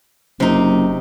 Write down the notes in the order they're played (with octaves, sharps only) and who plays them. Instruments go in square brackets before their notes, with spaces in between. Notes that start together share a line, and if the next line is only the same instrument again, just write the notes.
[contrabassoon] F#1 [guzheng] C3 D#4